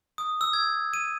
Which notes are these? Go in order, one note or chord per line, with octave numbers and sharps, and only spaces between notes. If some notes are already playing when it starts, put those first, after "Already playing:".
D#6
E6
G#6
D#7